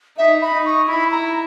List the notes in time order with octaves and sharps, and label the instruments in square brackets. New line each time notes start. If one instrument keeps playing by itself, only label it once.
[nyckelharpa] D#4 [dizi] E5
[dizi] B5
[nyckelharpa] D#4
[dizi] C#6
[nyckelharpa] E4 [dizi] B5
[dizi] A#5